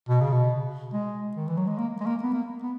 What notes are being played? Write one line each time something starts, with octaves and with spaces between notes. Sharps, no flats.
B2
C#3
B2
G#3
D#3
E3
F#3
G#3
A#3
G#3
A#3
B3
A#3
B3